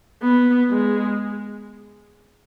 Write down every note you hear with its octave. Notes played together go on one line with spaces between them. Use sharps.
B3
G#3